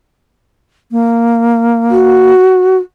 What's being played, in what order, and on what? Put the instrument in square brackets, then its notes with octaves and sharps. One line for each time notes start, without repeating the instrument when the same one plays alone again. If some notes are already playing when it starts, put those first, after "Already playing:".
[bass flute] A#3
[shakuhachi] F#4